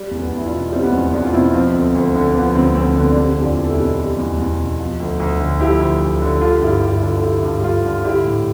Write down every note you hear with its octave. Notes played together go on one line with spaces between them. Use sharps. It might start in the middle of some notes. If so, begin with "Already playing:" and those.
Already playing: G3
E2
B3
E2
E4
D4 F4
B2
G3 C4 E4
B3
E2 C4
C4
E2 B3 D4
F4
B2 C4 E4
F3 C4
D2
D2
D3
F3 B3
D2 C4
D2 C4
D3 B3
D4
G3 C4
E2 G4
D4 F4
E2
A4
E4 G4
B2
G3
E2
E2
B2
F3
D2
D2
D3
F3 E4 G4
D2
D2
D3
G3 F4 A4
G2 E4 G4
G2 E4 G4
D3 F4 A4
A4
G3 E4 G4
G2
G4
G2 F4 A4
D3
G3 E4 G4
A2